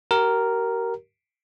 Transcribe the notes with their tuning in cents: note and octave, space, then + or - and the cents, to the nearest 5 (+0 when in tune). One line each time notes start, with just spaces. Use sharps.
G4 -40 A#4 +0